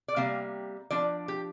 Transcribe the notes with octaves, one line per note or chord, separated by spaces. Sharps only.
D5
C3 G3 A#3 F5
F3 D4 D5
G4